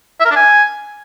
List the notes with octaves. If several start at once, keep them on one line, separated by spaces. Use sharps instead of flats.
E5
A#4
D4
G#5